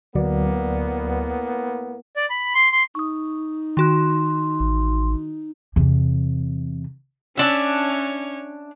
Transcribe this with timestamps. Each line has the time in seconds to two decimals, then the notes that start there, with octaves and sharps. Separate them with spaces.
0.15 D2 A2 F#3 A#3 B3 D5
2.16 D5
2.30 B5
2.54 C6
2.72 C6
2.95 D#4 C#6 D#6
3.77 D#3 F#4 C6 F#6
4.60 A1
5.76 E2 C3
7.37 C#4 D4 C#5 E5